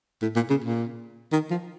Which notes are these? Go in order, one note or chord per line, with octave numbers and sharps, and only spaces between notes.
A2
A#2
C#3
A#2
D#3
F3